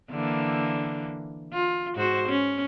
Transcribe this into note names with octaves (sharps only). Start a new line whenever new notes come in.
D3 E3 A#3
F4
G#2 F#4 C5
C#4